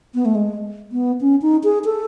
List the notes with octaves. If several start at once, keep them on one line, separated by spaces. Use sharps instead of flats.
B3
A3
G#3
B3
C#4
D#4
G#4
A4